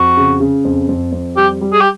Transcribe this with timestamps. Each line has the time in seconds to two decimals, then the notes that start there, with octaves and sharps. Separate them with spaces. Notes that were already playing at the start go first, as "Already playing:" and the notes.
Already playing: F2 F#4
0.17 C#3
0.40 C#3
0.65 F2
0.89 F2
1.12 F2
1.36 G3 G4
1.61 G3
1.73 G#4
1.81 G4